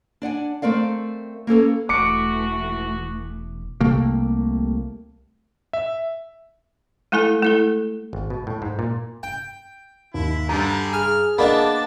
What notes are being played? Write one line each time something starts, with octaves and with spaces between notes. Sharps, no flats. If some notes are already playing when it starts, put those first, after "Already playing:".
D4 D5 F#5 G#5
A3 C4 A#4 D5 F5
A#3 C#4 A4 B4
E1 E3 A3 F#4 D6 C#7
C2 C3 A3 A#3
E5
G#3 A3 E4 A4 G#5
A3 E4 A4
G#1
B2
A2
G#2
A#2
G5
D#2 E4
G2 D3 G3 G#4 A#5
G#4 G#5 F6
A#3 B3 D4 D5 D#5 A5 B5